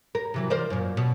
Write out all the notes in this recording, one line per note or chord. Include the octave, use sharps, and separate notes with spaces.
A#4
C3 E3 F#3
A#4 C5 D5
F#2 A#2
B2